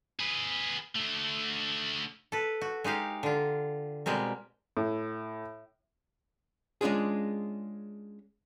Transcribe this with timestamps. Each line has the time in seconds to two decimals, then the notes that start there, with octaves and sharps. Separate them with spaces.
0.19 G#4 B4
0.96 A3 D4
2.32 A4 B4
2.61 F#4
2.84 G#3 D#4 G4 F5
3.23 D3 F4
4.06 B2 G3 G#3 C4 A#4
4.77 A2
6.81 G#3 C#4 D4 F4 G#4